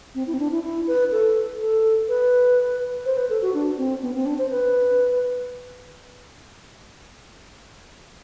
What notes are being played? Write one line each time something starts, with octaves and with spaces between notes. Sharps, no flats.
C4
E4
C4
D4
E4
E4
B4
A4
A4
B4
C5
B4
A4
F#4
D4
C4
B3
C4
D4
C5
B4